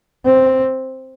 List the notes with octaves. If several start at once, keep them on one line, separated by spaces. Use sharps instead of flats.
C4